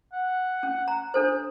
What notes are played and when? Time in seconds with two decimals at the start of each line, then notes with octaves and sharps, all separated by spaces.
0.13 F#5
0.63 C#4
0.88 A#5
1.14 D4 A4 C5